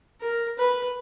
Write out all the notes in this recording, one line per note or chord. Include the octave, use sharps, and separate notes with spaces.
A#4
B4